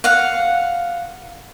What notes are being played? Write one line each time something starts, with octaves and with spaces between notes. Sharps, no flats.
F5 F#5